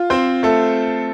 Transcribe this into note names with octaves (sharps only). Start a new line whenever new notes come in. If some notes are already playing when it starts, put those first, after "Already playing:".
Already playing: F4
C4 C5
A3 A4